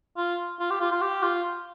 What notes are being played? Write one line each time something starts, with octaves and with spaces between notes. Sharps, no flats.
F4
F4
G4
F4
F4
G4
F4